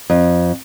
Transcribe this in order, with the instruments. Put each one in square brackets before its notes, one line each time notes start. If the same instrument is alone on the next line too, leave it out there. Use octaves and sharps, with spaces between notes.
[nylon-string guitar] F2